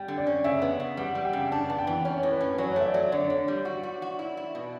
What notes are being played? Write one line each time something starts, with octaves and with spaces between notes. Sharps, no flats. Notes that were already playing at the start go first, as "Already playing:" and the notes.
Already playing: G3 G5
D3
D5
C#4
C#3 E5
B3
C#3
G3 F#5
G3
G5
C#3
D4 A5
B3 A5
G5
E3
C#4 C#5
A2
B4
C#4
F#3 C#5
A3 E5
D5
F#3
D3 C#5
D3
G3
F#4
F#4
F#4
E4
E4
B2